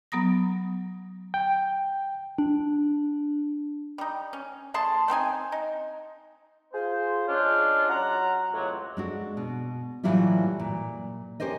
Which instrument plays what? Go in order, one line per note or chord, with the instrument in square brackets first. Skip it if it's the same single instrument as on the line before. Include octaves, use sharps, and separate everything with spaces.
[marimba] F#3 B3 A#5 D#6 A#6
[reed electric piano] G5
[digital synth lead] D4
[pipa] G3 D#4
C#4
A3 G#4 A5 C6
A3 C4 D#4 G#5
D#4
[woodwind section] F4 G#4 C5
G#3 C#4 D4 F4
F#3 F#5 A#5
C#2 A2 C3 F#3
[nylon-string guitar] G#3 D4 F#4
B2
A2 E3 F#3 G3 E4 F4
A#2
C#4 G4 A#4 C5 D#5